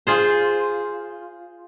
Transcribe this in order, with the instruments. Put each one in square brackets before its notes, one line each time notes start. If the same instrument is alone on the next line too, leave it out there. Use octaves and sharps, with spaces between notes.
[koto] F4 G#4 C5